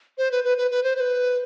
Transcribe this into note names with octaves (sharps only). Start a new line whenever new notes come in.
C5
B4
B4
B4
B4
C5
C5
B4